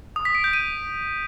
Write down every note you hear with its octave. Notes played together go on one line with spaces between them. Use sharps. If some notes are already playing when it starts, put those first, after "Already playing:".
D#6
B6
D7
G6
D#7